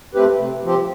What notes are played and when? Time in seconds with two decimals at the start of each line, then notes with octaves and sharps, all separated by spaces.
0.14 A3 C4 G4 B4
0.39 C3
0.64 F3 C4 G4